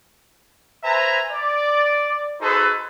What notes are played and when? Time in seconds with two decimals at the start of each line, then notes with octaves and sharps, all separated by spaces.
0.84 B4 C5 E5 G#5 A#5
1.32 D5
2.41 D#4 F#4 G#4 A4 B4 C5